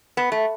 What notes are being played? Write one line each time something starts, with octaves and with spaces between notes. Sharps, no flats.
B3
A3